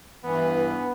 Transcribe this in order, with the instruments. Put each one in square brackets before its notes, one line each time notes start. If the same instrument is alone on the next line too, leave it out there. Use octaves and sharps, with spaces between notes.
[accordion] G2 E3 [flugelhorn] B3